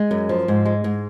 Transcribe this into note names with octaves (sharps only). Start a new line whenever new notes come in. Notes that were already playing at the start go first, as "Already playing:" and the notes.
Already playing: G#3
F#2
F3
G#2
G#3
G#2